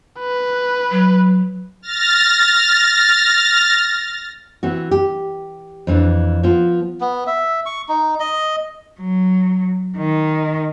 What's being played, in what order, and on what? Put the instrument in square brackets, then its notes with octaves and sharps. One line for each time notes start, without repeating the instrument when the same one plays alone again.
[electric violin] B4
[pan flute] F#3
[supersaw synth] F6 A6 A#6
[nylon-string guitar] E3 C4 F#4
G4
F2 E3 D4
F3 B3 F4
[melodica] B3
E5
C#6
D#4
D#5
[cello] F#3
D#3